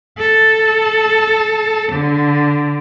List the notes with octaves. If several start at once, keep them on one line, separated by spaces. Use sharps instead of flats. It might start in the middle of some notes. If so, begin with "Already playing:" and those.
A4
D3